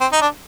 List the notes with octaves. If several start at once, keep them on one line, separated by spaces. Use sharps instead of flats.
C4
D#4
D4